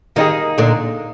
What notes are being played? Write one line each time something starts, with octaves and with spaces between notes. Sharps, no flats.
D#3 G3 A#3 D#4 G#4
A#2 D3